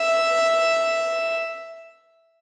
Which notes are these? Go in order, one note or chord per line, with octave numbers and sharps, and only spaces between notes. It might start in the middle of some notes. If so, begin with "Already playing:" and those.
Already playing: E5